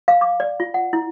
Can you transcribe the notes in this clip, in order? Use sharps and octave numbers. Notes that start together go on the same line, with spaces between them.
F5
D6
D5
F4
F#5
E4